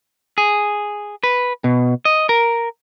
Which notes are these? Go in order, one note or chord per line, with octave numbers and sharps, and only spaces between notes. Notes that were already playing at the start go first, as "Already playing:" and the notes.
G#4
B4
B2
D#5
A#4